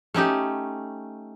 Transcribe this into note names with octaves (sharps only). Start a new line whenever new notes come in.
A3 C#4 D#4 G4